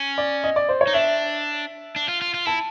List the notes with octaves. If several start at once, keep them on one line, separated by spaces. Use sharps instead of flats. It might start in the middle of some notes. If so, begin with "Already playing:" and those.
Already playing: C#4
D5
D#5
D5
C5
C#5
D#4
D4 E5
D4
F4
F4
F4
E4 A5